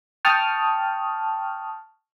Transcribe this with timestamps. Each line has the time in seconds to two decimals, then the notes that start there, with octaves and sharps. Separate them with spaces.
0.25 G5 A5 C#6 D#6 F6